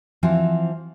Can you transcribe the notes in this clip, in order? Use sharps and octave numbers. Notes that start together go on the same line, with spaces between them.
E3 F3 C4 F#4